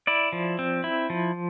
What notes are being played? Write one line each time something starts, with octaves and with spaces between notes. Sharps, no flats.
E4 D5
F3
C4
E4
F3